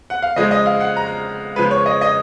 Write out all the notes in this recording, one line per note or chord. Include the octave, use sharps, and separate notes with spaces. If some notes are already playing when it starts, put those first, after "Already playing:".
F#5
F5
C#3 F3 G#3 D#5
D#5
F5
F#5
A#5
C#3 F3 G#3 B4
C#5
D#5
D#5